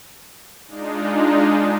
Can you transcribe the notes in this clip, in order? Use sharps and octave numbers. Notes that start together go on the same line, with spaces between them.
G#3 D4 D#4 F4